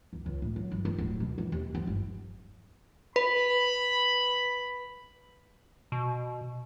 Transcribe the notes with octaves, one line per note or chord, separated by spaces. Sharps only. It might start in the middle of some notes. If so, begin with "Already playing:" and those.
D2
C#2
A2
F#3
G1
C4
D1
B2
E3
D#2
F3
G1
B4 B5
B2